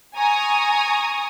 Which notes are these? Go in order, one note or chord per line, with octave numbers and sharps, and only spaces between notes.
G#5 A#5 C#6 D#6